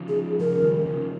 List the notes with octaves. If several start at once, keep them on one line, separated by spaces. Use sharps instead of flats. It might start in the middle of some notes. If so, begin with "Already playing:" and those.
Already playing: C#3 F3
G#4
C#3 F3 A#4
D#3 G3
C#3 F3